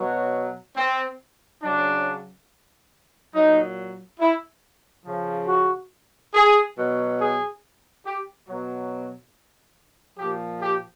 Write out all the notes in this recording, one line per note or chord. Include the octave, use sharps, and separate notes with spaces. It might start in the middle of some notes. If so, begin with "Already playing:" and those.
Already playing: B2 F#3
C4
C#3 F#3 D4
A#2 F#3 D#4
E4
C#3 F3
F#4
G#4
B2 F#3
G#4
G4
B2 F#3
A#2 F3 G4
G4